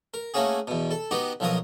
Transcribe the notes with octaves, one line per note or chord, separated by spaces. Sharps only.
A#4
A3 A#3 C#4 F#4 G#4
E2 B2
A4
B3 D#4 F#4 G4
B1 F3 F#3 A#4 D#6